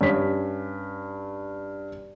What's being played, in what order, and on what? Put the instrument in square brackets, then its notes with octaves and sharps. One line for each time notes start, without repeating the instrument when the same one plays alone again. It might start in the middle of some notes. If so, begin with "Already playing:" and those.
[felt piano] G2 C#4 B6